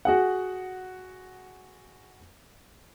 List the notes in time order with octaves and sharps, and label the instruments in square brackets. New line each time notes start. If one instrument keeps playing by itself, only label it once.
[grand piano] F#4 G#4 F#5